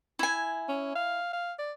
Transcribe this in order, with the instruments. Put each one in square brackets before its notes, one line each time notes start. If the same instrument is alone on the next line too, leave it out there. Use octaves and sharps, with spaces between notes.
[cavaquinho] E4 G#5
[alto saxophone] C#4
F5
F5
D5